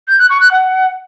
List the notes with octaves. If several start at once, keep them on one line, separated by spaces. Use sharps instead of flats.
G6
F#6
C#6
F#6
F#5